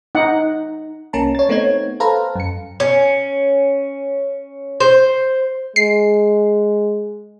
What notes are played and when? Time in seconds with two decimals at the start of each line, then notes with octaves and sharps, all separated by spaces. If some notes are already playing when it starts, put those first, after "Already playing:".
0.15 D#4 F#5
1.13 C2 A#3 C#4 A5 A#5
1.35 C#5 A6
1.49 A3 B3 C4 D#4 C#5 G#6
2.00 A4 B4 C5 F5 A5 A#5
2.35 F#2 C#7
2.80 C#4
4.80 C5
5.76 G#3 C7